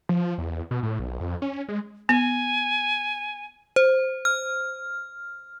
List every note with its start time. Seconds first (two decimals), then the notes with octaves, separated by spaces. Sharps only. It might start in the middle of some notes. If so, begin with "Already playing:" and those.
0.09 F3
0.38 E2
0.71 B2
0.83 A2
0.99 B1
1.20 F2
1.42 C#4
1.69 G#3
2.09 B3 G#5
3.76 C5
4.25 F6